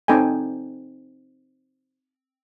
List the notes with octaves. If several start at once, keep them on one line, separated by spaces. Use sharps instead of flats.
C4 D#4 A4 G5 G#5